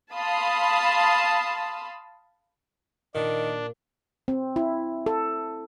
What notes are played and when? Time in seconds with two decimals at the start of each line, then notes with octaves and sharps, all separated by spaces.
0.14 F5 A5 B5 C6 D#6
3.15 A#2 D#3 D4
4.28 C4
4.56 E4
5.06 A4